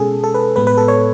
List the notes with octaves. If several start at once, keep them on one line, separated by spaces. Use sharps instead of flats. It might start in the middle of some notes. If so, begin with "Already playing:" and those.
Already playing: B2 G#3 C#4 G#4 A4
A4
B4
A2 G#3 B3 B4
B4
A4
C#5